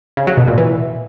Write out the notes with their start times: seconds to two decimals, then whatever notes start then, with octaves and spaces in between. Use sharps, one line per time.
0.17 C#3
0.27 F#3
0.37 B2
0.48 A#2
0.58 E3